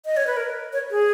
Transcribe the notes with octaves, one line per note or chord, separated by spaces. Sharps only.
D#5
C#5
B4
A#4
C#5
G#4